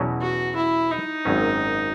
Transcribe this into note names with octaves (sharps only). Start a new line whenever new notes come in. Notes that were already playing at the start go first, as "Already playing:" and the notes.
Already playing: E2 B2 F#3 C#4
F#4
E4
D#4
G#1 F#2 D#3 F#3 C#4